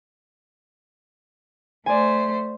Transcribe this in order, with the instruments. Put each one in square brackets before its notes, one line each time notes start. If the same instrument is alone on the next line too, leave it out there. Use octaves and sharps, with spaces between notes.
[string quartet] A3 C5 [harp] D5 G#5